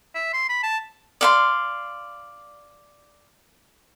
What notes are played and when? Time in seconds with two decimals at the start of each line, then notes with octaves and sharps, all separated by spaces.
0.15 E5
0.33 C6
0.49 B5
0.63 A5
1.21 D5 F5 C6